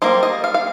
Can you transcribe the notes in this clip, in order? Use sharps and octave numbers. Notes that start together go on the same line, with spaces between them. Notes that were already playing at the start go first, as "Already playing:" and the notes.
G3 A#3 D#4 C5
D#5
F5
F5